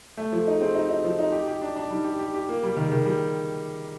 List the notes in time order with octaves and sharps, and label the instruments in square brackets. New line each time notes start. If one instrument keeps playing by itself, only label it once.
[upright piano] A3 [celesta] A4
[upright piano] F3 [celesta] A4
[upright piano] D#4
[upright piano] C4 [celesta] G#4
[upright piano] D#4 [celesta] G4
[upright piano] D#4
[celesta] F#4
[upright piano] F3
[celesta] G4
[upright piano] D#4
[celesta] F#4 [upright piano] G4
[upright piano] G4
D4
D4
[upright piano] G3 [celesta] D#4
[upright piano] G4
G4
G4
[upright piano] A#3 [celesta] F4
[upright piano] G3 [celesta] G4
[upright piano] D#3
[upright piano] D#3 [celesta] G#4
[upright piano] G3 [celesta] G#4